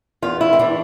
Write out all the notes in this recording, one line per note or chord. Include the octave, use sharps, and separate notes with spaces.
E2 F4
E4
C4
E3 D4